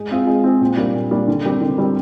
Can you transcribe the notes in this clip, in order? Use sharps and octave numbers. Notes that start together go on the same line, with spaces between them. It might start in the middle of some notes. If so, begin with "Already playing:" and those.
Already playing: G#3
C4 F4 G#4
G#3
C4 F4 G#4
A#2
G3 A#3 D4
A#2
G3 A#3 D4
D3
G3 C4 G4 A#4
D3
G3 C4 G4 A#4